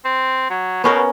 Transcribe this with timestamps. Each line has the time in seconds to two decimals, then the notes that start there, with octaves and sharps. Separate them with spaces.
0.05 C4
0.50 F#3
0.84 B2 B3 C#4 A#4